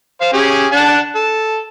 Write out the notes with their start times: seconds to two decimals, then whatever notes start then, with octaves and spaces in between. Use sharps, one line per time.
0.21 C5 F5
0.33 C#4 G4 G#4
0.72 D4 F#5 A5
1.15 A4